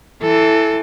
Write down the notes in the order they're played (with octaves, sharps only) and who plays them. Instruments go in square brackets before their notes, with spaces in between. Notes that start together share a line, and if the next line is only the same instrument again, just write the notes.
[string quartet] E3 [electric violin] A4